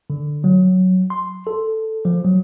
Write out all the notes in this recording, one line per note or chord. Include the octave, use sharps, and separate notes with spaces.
D3
F#3
C6
A4
F3
F#3